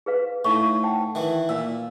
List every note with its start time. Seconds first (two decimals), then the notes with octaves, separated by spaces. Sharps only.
0.06 G#4 B4 F5
0.45 A2 D#4 F5 C#6
0.83 F#5 G5 A5
1.15 D#3 E3
1.49 A#2 F5 E6